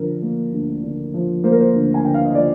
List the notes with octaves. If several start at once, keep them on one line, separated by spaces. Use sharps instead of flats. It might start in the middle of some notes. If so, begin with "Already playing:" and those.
Already playing: D3 F3 A#4
A#3
D2
D3
F3
A#3 C5
A#4
C5
D2
G#5
D3 G5
F5
D#5
F3 D5